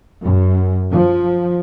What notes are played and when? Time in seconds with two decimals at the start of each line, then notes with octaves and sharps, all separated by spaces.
0.22 F#2
0.90 F3